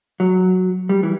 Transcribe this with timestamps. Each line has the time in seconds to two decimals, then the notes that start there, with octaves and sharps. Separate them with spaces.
0.20 F#3
0.89 G3
1.03 E3